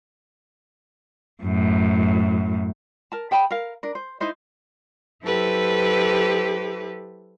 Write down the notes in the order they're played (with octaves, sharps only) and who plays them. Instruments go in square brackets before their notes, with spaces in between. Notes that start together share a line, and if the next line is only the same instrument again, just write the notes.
[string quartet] F#2 A2
[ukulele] A#4 A5
G#4 G5 A5 B5
A#4 F5
D4 A#4
C5
D#4 E4 C5 D#5
[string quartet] F#3 E4 G4 A4 B4 C5